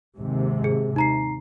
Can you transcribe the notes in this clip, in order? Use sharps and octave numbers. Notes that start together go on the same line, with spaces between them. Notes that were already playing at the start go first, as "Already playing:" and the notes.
D#2 G#2 C3
G#4
D#4 A#5 C7